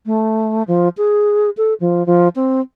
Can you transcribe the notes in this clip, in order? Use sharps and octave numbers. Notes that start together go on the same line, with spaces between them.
A3
F3
G#4
A4
F3
F3
C4